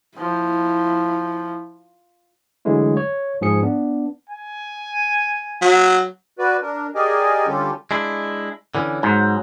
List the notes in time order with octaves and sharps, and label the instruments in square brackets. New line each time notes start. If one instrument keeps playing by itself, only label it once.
[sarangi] F3 [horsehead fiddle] E4
[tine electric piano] D3 E3 F#3 G#3 A3 E4
C#5
G#2 F3 G#4 C#7
B3 D4
[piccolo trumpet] G#5
[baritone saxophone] F#3
[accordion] F#4 B4 D5
D4 A#4
G4 G#4 A#4 D5 D#5 G#5
D3 G3 C#4 F4 G4 A4
[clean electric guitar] G#3 D4 E4
D3 E3 C#4
[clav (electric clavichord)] G#2 [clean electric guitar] F#3